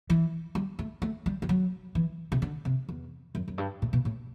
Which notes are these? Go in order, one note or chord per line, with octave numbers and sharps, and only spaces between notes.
E3
G3
A3
A3
G3
G3
F#3
E3
C3
D3
C3
E2
F#2
F#2
G2
A2
B2
A2